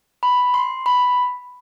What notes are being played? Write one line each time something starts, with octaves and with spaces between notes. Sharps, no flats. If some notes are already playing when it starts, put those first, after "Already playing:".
B5
C6
B5